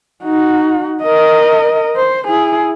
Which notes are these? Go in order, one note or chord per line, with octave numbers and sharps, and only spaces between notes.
D#4 F#4
A#4 D#5
C5
E4 G#4